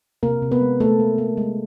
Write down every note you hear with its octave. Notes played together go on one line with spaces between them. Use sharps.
C3 A#3 A#4
C3
B3 B4
G#3
A3 A#3 A4
A#3
A#3
G#3